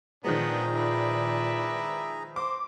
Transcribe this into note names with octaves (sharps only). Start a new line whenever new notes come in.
A#2 D#3 F3 G#3 B3 D4 G#4 A#5
B4 D5 E5
C5 D6